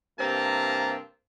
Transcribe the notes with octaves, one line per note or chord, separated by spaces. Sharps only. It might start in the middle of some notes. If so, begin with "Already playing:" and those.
G2 C3 A#3 C4 A5 A#5